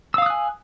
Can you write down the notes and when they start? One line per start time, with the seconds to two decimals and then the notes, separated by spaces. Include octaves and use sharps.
0.14 E6
0.18 F5
0.22 D#6
0.26 F#6
0.30 G#5